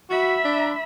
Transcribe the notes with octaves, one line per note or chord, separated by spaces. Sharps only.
F#4 E5 B5
D4